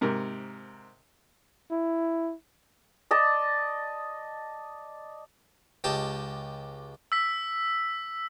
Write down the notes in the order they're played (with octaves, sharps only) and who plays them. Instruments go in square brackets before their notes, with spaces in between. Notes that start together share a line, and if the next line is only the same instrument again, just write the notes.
[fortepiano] G#2 C3 A#4
[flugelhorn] E4
[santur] D5 D#5 A5
[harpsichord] C#2 G4 D#5 A5
[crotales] E6 B6